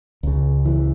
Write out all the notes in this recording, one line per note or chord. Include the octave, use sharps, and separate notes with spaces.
C#2 C#3
E3